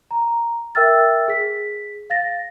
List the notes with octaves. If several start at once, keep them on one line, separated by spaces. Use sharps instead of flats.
A#5
A#4 E5 G5 E6 F6 A6
G#4 B6
F5 A6 A#6